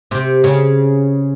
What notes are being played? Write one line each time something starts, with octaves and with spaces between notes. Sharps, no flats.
C3 C4
C#3 C#4